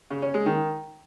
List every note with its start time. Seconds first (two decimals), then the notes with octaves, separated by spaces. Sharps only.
0.10 C#3
0.22 C#4
0.34 G#3
0.46 D#3